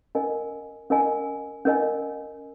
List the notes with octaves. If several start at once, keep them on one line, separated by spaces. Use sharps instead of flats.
C#4 A#4 D#5 G#5
C#4 A#4 D#5 G#5
C#4 A#4 D#5 G#5